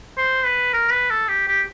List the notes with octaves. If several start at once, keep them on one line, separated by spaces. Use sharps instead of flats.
C5
B4
A#4
B4
A4
G4
G4